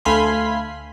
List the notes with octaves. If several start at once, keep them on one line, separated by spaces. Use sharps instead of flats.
D2 A3 F5 G#5 B5 C6